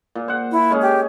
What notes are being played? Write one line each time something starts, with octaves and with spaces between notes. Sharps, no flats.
A#2
C5 F#5
E4
G#3 C#4 G#4
G4